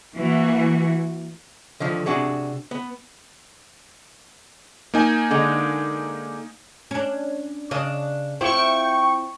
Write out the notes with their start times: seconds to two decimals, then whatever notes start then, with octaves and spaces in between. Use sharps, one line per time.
0.16 E3 A#3 F#4
1.80 D3 D#3 F3
2.06 C3 D4 F#4 G#4
2.71 B3
4.94 A#3 D#4 G#5
5.31 D3 G#3
6.91 C#4 D4
7.71 C#3 D4 D#5
8.41 C4 E4 F4 G5 C#6